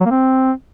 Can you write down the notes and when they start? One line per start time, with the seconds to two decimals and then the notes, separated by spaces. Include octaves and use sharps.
0.01 F#3
0.06 A#3
0.11 C4